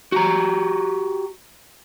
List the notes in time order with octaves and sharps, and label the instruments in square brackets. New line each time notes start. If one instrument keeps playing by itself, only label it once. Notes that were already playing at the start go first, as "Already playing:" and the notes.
[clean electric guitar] F#4 G4 A#5